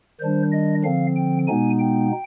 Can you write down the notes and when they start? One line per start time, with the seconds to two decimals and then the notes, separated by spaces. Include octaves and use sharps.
0.20 D#3 G3 D4 C5
0.52 D#5
0.84 D3 F3 C4 F5
1.16 G5
1.48 B2 G#3 B3 D#4 G#5
1.80 G5